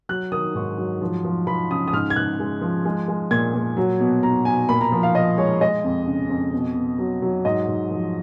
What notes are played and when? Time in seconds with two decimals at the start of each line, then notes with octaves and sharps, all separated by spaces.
0.09 F#3 F#6
0.32 D#3 D#6
0.55 G#2 C#6
0.78 F#3
1.01 F3
1.25 F3
1.47 F3 B5
1.70 C#3 D#6
1.88 D#6
1.93 G#2 F6
2.10 G#6
2.16 G#2 F#6
2.39 G#3
2.61 F3
2.85 G#3
3.08 G#3
3.31 A#2 G#6
3.55 A#2
3.77 F#3
4.00 B2
4.23 B2 A#5
4.45 B2 G#5
4.69 A#2 B5
4.81 A#5
4.92 F3
5.03 F5
5.15 F3 D#5
5.37 G#3 C#5
5.61 G#3 D#5
5.84 F2
6.06 C#3
6.29 F2
6.53 B2
6.76 B2
6.98 F#3
7.22 F#3
7.45 G#2 D#5
7.68 G#2
7.91 F3